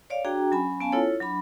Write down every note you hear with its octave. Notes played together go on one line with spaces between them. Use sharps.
C#5 D5 F5
D4 F#4 G#4 G5 A#5
F#3 C#4 G#5 B5
B3 C#4 F5 G#5 A5
E4 F4 A4 C#5
F#3 D4 B5